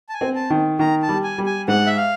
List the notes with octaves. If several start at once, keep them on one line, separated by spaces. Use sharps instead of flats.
A5
G#5
C4
A5
D#3
D#3 A#5
A5
G3
G#5
G3
G#5
G#2 F#5
E5
F5